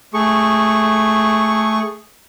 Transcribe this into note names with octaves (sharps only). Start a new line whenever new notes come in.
A3 G#4 C#6